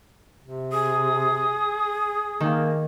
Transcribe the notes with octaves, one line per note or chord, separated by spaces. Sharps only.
C3
G#4 D#6
D#3 A#3